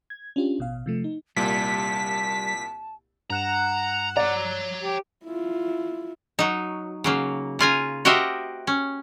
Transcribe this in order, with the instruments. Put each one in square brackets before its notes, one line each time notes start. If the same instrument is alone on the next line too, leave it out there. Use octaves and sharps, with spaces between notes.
[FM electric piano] G#6
C#4 D4 F4 G4
A1 B2 F5
C3 F3 A3
D#4
[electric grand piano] C2 A#2 [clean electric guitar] G3 [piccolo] A5 [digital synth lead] B6
[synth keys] G2 F#6 E7 [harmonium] F#5 [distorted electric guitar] A#5
[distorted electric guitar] C#5 A#5 [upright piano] D5
[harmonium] G4
[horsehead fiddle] E4 F4
[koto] F#3 D#4
C#3 F#3 A#3
C#3 F4 G#5 A#5
F#4 G4 A#4 C5 D#5 E5
C#4